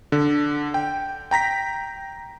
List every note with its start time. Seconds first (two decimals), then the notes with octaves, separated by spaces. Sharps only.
0.12 D3
0.74 G5
1.31 G5 A#5 A#6 B6